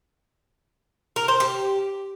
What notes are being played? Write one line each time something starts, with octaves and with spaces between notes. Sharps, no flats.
A#4
C5
G4